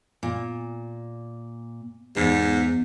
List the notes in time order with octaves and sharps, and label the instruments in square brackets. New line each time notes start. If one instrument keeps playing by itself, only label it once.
[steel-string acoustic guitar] A#2
[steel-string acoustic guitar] E2 [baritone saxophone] G#2